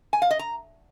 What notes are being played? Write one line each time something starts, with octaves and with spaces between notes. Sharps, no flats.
G#5
F5
D#5
A#5